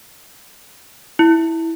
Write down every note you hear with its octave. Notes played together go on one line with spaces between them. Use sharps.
E4